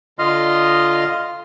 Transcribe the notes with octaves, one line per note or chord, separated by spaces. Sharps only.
D3 F4 D#5 F5 C6 F6